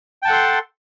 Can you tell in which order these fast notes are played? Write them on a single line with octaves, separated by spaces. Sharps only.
G5 A5 F#5 A4 C6